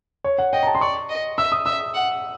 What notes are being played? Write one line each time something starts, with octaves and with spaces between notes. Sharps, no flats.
C#5
F#5
D#5 G5
A#5
A5
C6
D5 C#6
D#5
E5 E6
D#6
E5 E6
F#5